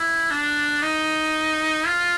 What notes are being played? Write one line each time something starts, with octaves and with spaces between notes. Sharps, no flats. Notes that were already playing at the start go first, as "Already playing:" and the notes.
Already playing: E4
D4
D#4
F4